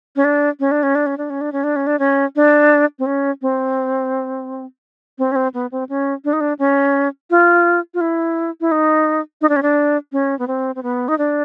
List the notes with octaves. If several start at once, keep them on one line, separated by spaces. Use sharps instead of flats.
C#4
D4
C#4
D4
C#4
D4
C#4
D4
C#4
D4
C#4
D4
C#4
D4
C#4
D4
C4
C#4
C4
C4
C#4
C4
B3
C4
C#4
D4
D#4
D4
C#4
F4
F4
E4
E4
D#4
D#4
D4
C#4
D4
C#4
B3
C4
C4
B3
D#4
D4